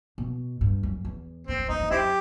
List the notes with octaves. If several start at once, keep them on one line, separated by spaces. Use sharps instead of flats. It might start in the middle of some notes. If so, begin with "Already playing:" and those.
B2
G2
F#2
E2
E2 C4
F#2
E2 D#4
E2
F#2 C4 E4 G4